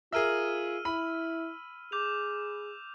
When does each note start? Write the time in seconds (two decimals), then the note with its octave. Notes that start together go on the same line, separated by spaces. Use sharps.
0.12 F4 G#4 A#4 E5 E6 F6 D#7
0.85 E4 B5
1.92 G#4 D6 G6 F7